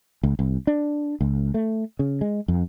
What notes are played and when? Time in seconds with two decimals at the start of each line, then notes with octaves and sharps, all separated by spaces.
0.23 C#2
0.39 C2
0.67 D4
1.21 C#2
1.54 A3
1.99 C#3
2.21 G#3
2.48 F2